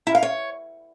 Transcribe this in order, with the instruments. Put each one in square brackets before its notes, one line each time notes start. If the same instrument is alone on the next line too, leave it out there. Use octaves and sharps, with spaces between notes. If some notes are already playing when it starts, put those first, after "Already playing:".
[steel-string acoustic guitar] E4
F5
C#5